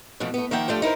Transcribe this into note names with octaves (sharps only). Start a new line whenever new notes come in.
B2 E3 F3 A3
A3 B3
D#3 F3 A#3 E5 F#5 G5
F3 A3 D4 F4 G4
D#4 E4 A#4 C5